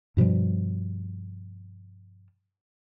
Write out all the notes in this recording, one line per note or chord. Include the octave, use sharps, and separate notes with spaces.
G2 B2 F3 G3